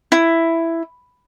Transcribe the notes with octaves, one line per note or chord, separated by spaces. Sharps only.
E4